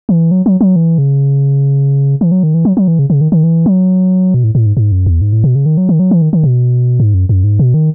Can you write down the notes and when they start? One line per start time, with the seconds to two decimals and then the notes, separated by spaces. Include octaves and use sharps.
0.09 E3
0.31 F#3
0.46 F#3
0.61 F#3
0.76 E3
0.98 C#3
2.21 E3
2.32 F#3
2.43 D#3
2.54 E3
2.65 F#3
2.77 F#3
2.88 E3
2.99 C#3
3.10 C#3
3.21 D#3
3.32 D#3
3.43 E3
3.66 F#3
4.34 B2
4.44 A2
4.55 A2
4.66 G#2
4.77 G#2
4.92 F#2
5.06 E2
5.21 G#2
5.33 A2
5.44 B2
5.55 C#3
5.66 D#3
5.77 F#3
5.89 D#3
6.00 F#3
6.11 E3
6.22 D#3
6.33 D#3
6.44 B2
7.00 G#2
7.14 F#2
7.29 F#2
7.44 G#2
7.59 B2
7.74 D#3